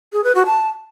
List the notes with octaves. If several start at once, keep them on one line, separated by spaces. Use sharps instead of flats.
G#4
B4
F#4
A5